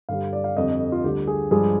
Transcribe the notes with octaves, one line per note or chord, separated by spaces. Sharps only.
G2 D3 G3 F5
D5
F5
F2 D3 G3 D#5
F4
D2 D3 G3 G4
G#4
G2 F3 G#3 G#4